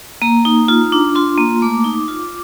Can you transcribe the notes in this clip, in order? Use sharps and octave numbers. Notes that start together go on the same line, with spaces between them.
A#3 A#5
D#4
F4
D4
F4 C6
A#3
A3 D6
D#4
F4